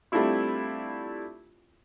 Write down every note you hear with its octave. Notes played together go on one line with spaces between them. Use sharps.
G3 A3 C4 D4 E4 F4